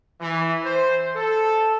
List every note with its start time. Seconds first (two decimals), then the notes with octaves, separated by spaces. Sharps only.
0.20 E3
0.64 C5
1.16 A4